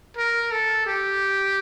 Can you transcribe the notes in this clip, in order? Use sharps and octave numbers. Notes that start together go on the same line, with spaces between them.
A#4
A4
G4